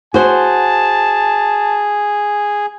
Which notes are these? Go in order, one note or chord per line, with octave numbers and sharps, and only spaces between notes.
F#4 G#4 C5 A5